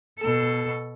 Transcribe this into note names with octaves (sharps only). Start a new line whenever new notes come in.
B2 A4